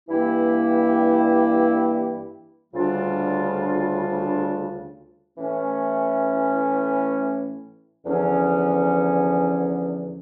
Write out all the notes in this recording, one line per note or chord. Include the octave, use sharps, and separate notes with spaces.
G2 E3 A#3 E4 G4
D2 C#3 G3 D4 F4
A2 E3 A3 C#4
E2 D3 F3 C#4